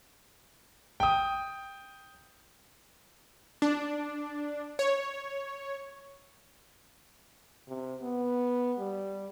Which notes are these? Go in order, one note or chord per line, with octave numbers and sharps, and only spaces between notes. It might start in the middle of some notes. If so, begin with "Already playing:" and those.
G5 D#6
D4
C#5
C3
B3
G3